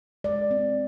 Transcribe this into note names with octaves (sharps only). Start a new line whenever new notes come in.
G#3 D5
C4